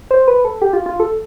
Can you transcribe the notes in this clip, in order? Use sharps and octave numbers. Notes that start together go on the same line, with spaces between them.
C5
B4
A4
G4
F4
F4
A4